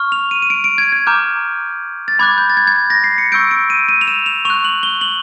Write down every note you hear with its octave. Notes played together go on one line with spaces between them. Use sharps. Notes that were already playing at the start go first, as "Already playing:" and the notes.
Already playing: C#6 F6
F7
D#7
D#7
D7
D7
G#6
G#6
A#5 D6 F6 G6
A6
B5 D6 F#6 G#6
G6
A6
G#6
G#6
A6
A#6
C7
C#7
C#6 E6 G6 D7
D7
D#7
D#7
F7
E7
F7
C#6 F#6 F7
F#7
G7
F#7